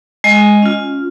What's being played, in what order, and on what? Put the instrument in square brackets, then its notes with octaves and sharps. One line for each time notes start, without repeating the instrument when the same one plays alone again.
[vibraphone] G#3 D#5 G#5
C#4 F4